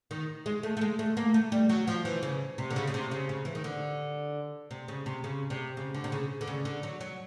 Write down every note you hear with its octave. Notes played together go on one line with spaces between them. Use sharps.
D#3
G#3
A3
A3
G#3
A3
A#3
A3
G3
F#3
F3
E3
C#3
C3
D3
C#3
C#3
C3
C#3
C#3
E3
D#3
D3
C3
C#3
C3
C#3
C3
C#3
D3
C3
C#3
D3
C#3
D3
F#3
F#3